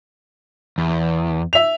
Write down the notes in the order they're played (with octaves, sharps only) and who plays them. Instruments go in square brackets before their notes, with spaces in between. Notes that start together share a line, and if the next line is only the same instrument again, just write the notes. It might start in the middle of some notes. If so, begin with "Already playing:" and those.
[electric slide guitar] E2
[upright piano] E5 F7